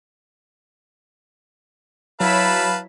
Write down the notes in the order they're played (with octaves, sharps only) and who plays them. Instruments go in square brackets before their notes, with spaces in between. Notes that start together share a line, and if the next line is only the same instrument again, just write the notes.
[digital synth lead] F#3 [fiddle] E4 B5 [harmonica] B4 F5 A5